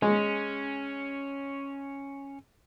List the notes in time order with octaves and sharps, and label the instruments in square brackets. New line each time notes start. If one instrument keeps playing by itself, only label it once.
[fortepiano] G#3 [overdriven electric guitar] C#4